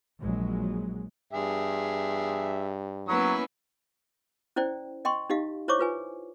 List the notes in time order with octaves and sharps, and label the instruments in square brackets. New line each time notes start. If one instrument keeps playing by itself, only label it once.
[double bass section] A#1 F#3 G#3
[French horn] G2 [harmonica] G#4 E5
[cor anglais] F#3 [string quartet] A#3 B3 C#4 [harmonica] E4 E6
[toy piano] C#4 E4 C5 D5 G5
D#5 G5 C6 C#6
D#4 G4 D#5 F5
E4 C5 C#5 E5 C#6 D6
F4 B4 G#5